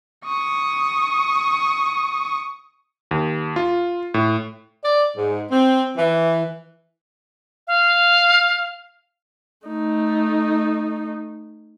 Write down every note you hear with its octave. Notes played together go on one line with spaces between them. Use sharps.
C#6 D#6
D#2
F4
A2
D5
G#2
C4
E3
F5
A3 D#4